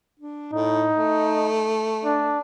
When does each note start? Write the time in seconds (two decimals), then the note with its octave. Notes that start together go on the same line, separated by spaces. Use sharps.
0.20 D4
0.53 A2 D#4
0.96 A3
2.04 D4